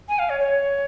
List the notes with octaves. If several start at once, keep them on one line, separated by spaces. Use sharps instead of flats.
G#5
F5
C#5
C#5